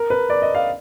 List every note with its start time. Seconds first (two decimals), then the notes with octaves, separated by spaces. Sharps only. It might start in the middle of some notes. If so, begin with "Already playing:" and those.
Already playing: A#4
0.10 B4
0.30 D5
0.42 D#5
0.55 F5